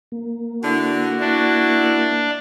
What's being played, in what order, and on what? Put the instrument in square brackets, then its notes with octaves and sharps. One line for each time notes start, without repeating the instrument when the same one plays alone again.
[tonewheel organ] A#3
[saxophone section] D3 D4 E4 [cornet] F#4
[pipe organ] D4 [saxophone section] E4